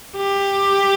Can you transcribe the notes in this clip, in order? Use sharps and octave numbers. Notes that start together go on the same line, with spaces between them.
G4